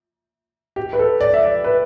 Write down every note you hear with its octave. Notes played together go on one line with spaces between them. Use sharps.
G4
B4
A4
D5
E5
D5
B4